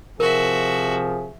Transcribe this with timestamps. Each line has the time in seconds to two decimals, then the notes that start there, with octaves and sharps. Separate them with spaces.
0.20 C3 F3 F#4 G#4 A#4 E5